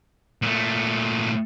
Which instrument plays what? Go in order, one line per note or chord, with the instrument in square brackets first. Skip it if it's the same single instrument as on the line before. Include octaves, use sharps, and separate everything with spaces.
[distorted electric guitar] A#2 A3